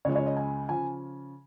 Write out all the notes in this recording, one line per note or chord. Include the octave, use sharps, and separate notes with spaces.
C#2 C#3 F3 G#3 C#5
C#5
D#5
G#5
C#3 F3 G#5